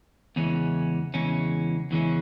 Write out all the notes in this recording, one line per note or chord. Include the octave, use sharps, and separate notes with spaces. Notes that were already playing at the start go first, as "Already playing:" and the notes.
E2 C#3 E3 G#3 C#4
E2 C#3 E3 G#3 C#4
E2 C#3 E3 G#3 C#4